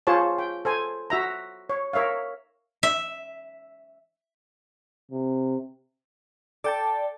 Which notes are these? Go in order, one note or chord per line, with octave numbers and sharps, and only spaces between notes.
F4 G#4 C5 C#5 A5
G5
A4 C5 G#5
F#4 E5 A#5
C#5
A#4 C#5 E5 F5
E5
C3
A4 D5 G5 A5